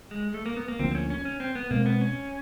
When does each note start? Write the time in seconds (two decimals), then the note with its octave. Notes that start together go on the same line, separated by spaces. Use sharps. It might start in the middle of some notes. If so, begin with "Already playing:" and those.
0.11 G#3
0.34 A3
0.46 A#3
0.57 B3
0.68 A#3
0.79 D2 D3 F3 A#3 C4
0.91 C4
0.95 C#4
1.10 C#4
1.25 C#4
1.40 C4
1.55 B3
1.71 B2 G#3 A#3 C4
1.86 B3
2.01 C#4